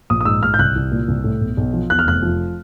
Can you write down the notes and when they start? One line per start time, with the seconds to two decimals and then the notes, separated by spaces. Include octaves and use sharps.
0.10 A#1 D#6
0.21 D#6
0.25 G#2 E6
0.43 A#1 F6
0.54 G6
0.59 C2 F#6
0.76 C2
0.91 A#2
1.08 C2
1.24 A2
1.41 B1
1.57 B1
1.73 F3
1.90 E2 F#6
1.99 F6
2.06 F1 F#6
2.22 F3